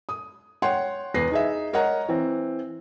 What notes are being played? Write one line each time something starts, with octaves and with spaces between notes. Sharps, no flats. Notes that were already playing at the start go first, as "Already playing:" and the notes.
D#6
C#5 F#5 G5 C6
E2 B3 B4 A#6 C7
D#4 G#4 E5
A#4 C#5 D#5 F#5 A#5
E3 C4